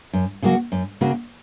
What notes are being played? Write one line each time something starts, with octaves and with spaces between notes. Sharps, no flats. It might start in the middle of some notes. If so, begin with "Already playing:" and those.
F#2
C#3 F#3 A#3 F#4
F#2
C#3 A#3 F#4